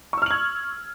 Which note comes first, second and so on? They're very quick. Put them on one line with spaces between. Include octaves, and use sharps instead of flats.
C#6 E6 F6 F#7 G#6